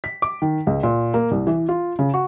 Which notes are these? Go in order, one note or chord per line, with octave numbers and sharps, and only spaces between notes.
B6
D6
D#3
C#2
A#2
A#3
C2
E3
F4
C#3
F#4